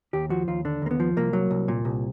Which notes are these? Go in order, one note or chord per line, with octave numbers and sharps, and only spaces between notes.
D#2 G4
F3 F#4
D#2 F4
D3 D4
D#2 A#3
B3
F3
C2 A#3
F#3
C2
A#2
C2